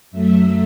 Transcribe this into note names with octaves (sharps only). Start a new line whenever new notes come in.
F#2 F#3 A3 E5